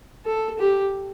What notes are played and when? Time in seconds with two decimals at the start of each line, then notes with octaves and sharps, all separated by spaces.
0.25 A4
0.59 G4